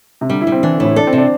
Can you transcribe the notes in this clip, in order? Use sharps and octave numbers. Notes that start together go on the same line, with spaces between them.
C3
D3 G3
E4
G3
C4
E3 D4
D3
A2
E4
D4 A4
C4
C3
D4